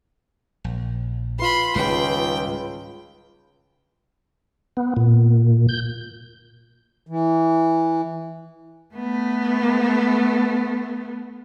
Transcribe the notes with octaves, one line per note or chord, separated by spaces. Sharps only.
A#1
F4 B4 B5 C6
C#2 G#2 D#3 G3 B4 G5
B3
A#2
G6
E3
A3 B3